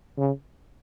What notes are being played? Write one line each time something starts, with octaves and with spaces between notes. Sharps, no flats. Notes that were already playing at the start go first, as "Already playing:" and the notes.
C#3